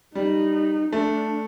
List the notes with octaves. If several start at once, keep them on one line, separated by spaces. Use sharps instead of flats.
G3 D#4
A3 D4